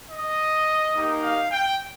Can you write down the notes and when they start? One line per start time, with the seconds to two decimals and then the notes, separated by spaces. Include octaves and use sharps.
0.09 D#5
0.94 A#3 D#4 G4
1.22 F5
1.51 G5